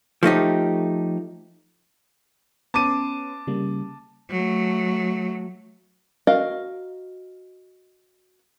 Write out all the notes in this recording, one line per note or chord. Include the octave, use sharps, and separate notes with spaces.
F3 A3 D#4 G4
B3 C#4 A5 C6 D6 D#7
C#3 G3 A#3
F#3 A3
F#4 A#4 D#5 F5